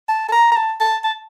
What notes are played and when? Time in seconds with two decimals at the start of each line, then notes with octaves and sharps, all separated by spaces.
0.09 A5
0.28 A5
0.32 A#5
0.52 A#5
0.57 A5
0.80 A5
1.04 A5